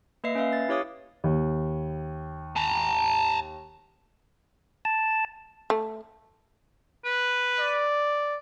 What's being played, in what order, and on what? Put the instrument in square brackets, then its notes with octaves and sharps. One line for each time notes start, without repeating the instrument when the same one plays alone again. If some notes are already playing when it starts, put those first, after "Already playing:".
[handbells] A#3 B4 D#5 E5 C7
C#4 B4 E5 F5
A6
E4 G4 C#5 F5 D6 D#6
[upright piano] D#2
[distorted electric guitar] A5 A#5
[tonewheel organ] A5
[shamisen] A3
[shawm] B4
[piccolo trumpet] D5